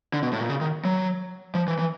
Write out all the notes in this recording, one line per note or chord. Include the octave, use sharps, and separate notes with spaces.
D3
B2
A2
A#2
C#3
D#3
F#3
F3
E3
E3